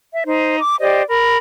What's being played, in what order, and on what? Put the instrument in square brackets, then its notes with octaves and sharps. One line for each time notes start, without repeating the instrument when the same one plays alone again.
[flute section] E5
D#4 C5
D6
G4 C5 D5 D#5
A#4 B5